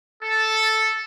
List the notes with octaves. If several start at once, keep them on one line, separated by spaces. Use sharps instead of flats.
A4